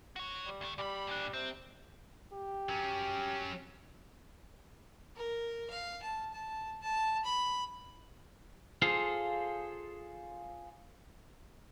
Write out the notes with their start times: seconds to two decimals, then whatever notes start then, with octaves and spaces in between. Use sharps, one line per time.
0.16 F#4 C#5
0.46 G3
0.61 D2 A3
0.78 A#2 G3 B5
1.07 A#2 D4
1.34 C3 C4
2.33 G4
2.69 F#3 C#4
5.16 A#4
5.70 F5
6.03 A5
6.33 A5
6.81 A5
7.25 B5
8.82 F4 G#4 A4 C5 F5